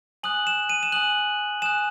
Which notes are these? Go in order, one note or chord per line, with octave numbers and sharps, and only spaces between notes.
G#5 D#6 F#6 F#7
E7
D#7
E7
G#5 D#6 F#6 F#7
G#5 D#6 F#6 E7